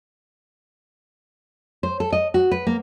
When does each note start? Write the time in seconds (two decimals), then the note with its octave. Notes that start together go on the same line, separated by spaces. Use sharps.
1.83 C5
2.00 A4
2.13 D#5
2.34 F#4
2.51 B4
2.67 A#3